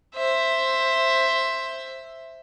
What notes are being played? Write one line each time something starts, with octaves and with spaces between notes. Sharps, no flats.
C5 E5